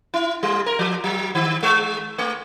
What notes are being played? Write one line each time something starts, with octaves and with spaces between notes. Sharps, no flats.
E4
G3
A#4
F3
F#3
D#3
G#3
A3